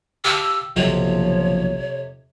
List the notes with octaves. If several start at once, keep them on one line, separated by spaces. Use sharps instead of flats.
G4 F5 A5 E6
F#1 B1 F2 C3 F3 F#3 C#5